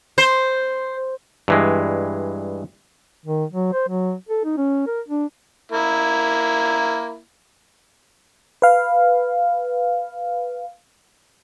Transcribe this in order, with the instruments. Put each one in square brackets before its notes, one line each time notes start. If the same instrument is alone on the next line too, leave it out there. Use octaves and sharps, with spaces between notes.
[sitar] C5
[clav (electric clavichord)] G2 E3 G#3
[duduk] D#3
F#3
C5
F#3
A4
D#4
C#4
A#4
D4
[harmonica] A#3 E4 A#4
[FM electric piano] B4 F5